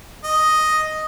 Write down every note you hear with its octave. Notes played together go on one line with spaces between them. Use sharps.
D#5